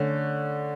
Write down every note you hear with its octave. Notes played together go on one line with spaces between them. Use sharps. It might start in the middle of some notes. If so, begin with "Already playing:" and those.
Already playing: D3 A3 C#4